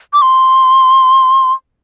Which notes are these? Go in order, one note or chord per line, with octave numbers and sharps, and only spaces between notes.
D6
C6